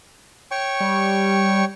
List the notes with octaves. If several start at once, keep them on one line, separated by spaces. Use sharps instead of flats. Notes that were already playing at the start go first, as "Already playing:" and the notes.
C#5 G5 C#6
G3